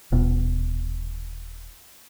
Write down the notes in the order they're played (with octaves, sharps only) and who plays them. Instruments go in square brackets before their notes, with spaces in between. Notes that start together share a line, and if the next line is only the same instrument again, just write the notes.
[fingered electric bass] D#1 B2